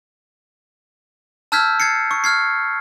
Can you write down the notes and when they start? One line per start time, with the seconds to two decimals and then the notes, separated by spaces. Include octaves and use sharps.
1.52 A5 E6 F6 G6 G#6 B6
1.80 G#6 A6 C7 C#7
2.11 C#6
2.24 F6 G#6 C7